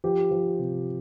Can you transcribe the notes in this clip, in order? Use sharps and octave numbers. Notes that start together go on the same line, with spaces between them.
F3 G4
F3
C3